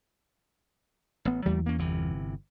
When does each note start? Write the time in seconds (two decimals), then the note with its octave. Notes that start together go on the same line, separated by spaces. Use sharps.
1.25 A1 B3
1.46 E2 F#3 A3 A#3
1.66 A#3 C#4
1.78 G1 C3 E3